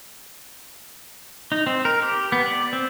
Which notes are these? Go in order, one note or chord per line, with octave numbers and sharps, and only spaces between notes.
D#4
C4
A#4
G4
B3
D5
C4